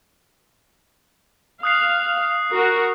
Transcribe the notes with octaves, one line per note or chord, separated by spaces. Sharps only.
F5 D#6 F#6 C7
F#4 A#4